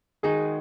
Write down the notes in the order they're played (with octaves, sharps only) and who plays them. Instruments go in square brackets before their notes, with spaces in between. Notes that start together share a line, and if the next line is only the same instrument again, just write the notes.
[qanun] D#3 G#3 D#4 F#4 [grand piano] G#4